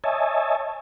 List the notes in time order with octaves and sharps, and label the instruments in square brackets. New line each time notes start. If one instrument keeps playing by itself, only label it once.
[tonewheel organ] C#5 D#5 E5 G#5 A5